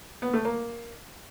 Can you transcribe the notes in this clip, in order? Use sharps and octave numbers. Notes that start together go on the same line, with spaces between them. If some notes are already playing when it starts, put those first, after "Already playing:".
B3
A3
A#3